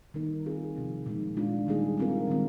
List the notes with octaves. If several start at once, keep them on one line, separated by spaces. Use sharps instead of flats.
D#3 G3 A#3 D#4 A#4
G3 C4 F4 G#4
C3 F3 C4
A#2 F3 G#3 D#4
G#3 D4 F4
D#3 G3 A#3 D#4 G#4
G3 C4 F4 A#4
D#3 G#3 C4